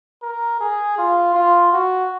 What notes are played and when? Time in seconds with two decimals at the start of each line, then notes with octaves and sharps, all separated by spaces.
0.22 A#4
0.60 G#4
0.98 F4
1.35 F4
1.72 F#4